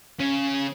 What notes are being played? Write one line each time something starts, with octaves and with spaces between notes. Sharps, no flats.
C#3